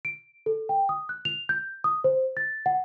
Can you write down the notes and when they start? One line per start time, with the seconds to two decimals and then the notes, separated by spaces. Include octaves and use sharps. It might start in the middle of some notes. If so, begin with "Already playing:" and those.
0.05 D7
0.46 A4
0.69 G5
0.89 D#6
1.09 F#6
1.25 F7
1.49 G6
1.84 D#6
2.04 C5
2.37 A6
2.66 F#5